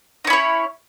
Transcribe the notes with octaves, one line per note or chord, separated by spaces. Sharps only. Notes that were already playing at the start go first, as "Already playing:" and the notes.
C#4 D#4 E4 C#5